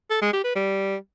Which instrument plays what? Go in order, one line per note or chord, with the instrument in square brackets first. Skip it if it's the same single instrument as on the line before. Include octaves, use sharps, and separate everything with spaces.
[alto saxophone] A4
G#3
G4
B4
G3